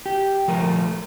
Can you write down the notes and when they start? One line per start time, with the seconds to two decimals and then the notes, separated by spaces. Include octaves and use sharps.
0.06 G4
0.48 F3 A3 A#4